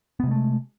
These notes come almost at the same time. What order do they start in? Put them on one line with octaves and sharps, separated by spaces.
B3 C3 G#3 A3